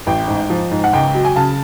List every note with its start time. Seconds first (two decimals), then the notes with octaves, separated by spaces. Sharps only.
0.07 A1 G5
0.28 G#2
0.50 F3
0.71 G#2
0.84 F#5
0.93 C#2 G5
1.14 F#3
1.25 G#5
1.36 C#3 A5